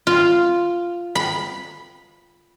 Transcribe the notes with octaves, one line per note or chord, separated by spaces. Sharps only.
F4
B5